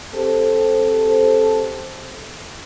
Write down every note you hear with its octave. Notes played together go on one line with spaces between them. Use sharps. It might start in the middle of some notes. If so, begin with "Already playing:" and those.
C4 G4 A4 C5